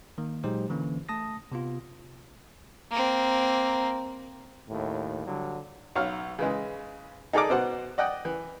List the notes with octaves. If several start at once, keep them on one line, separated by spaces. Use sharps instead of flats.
D#3 A#3
A#2 F#3 G#3 D#4 G4 C5
D3 E3 A#3 C#4
A3 A5 D#6 A#6
C3 B3 F4
A#3 C4
D#2 A2
D3 F#3 G3
B1 C#5 F5
C#3 E3 G#3
D#4 G#4 A4 D5 A#5 D6
B2 C5 F#5
D5 D#5 F#5 G5
E3